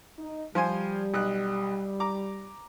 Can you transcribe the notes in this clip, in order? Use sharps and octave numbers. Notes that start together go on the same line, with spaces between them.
D#4
F3 G3 C5 G#5
B1 F#6
A#5 D6